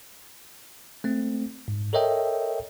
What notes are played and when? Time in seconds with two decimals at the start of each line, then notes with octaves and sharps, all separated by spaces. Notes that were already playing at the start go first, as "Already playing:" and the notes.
1.04 A3 C4
1.68 G#2
1.93 A4 A#4 C#5 D#5 E5 G5